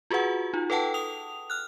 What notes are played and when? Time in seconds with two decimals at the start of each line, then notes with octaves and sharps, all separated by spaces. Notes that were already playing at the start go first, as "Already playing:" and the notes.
0.10 F4 F#4 G#4 B4 F#5
0.54 D#4 F4
0.70 A4 B4 F#5 G5 A5
0.94 D#6 F7
1.50 F6 F#6